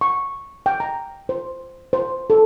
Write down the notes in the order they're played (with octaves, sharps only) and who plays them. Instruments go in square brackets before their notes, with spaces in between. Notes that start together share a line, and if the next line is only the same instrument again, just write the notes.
[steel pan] C#6
G5
A#5
C5
C5
A4